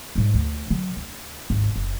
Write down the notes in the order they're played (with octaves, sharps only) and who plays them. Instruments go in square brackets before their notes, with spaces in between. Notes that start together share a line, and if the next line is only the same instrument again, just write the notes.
[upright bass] G#2 G3
D2
D3 F#3
D2
G#1 D2
F#1